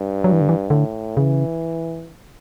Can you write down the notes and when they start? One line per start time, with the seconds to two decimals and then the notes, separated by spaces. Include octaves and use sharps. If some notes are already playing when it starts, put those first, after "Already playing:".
Already playing: G2
0.24 F#3
0.32 E3
0.41 D3
0.49 E3
0.69 A2 D3
1.17 C#3 E3